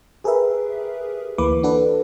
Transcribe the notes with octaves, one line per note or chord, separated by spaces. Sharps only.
G4 G#4 A#4 B4 E5
D2 E3 A#3 B4 D6
D4 F#4 A4 B4